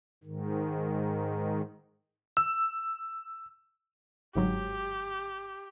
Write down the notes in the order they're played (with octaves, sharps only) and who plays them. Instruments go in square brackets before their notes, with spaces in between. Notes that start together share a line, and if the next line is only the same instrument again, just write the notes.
[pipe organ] G#2 D#3
[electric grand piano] E6
[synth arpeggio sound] G1 G#2 F#3 [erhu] G4